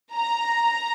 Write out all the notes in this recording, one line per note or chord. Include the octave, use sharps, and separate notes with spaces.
A#5